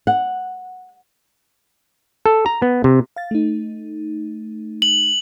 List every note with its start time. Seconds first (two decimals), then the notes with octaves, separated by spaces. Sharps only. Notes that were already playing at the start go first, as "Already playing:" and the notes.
0.07 F#5
2.26 A4
2.46 A#5
2.62 B3
2.84 C3
3.16 F5 A6
3.31 A3 D#4
4.82 F#7